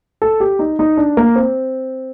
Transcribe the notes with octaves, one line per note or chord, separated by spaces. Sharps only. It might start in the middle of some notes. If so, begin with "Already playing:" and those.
A4
G4
D#4
D#4
D4
A#3
C4